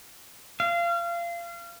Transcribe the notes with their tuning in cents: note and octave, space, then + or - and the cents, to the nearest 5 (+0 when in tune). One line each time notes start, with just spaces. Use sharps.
F5 -30